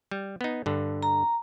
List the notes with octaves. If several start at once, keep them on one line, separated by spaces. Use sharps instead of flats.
G3
B3 D#4
G2 D3
A#5